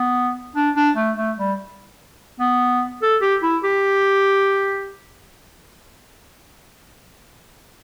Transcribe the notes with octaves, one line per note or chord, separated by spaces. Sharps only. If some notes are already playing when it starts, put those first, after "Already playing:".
Already playing: B3
D4
D4
A3
A3
G3
B3
A4
G4
E4
G4